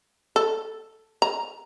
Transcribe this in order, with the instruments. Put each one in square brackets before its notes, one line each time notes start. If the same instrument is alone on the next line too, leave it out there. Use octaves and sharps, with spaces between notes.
[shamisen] A4
A#5